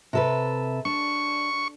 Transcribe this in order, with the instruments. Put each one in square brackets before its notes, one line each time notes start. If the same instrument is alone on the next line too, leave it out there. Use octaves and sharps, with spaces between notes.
[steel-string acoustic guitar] C3 A4 B4
[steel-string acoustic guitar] D4 [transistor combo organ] C#6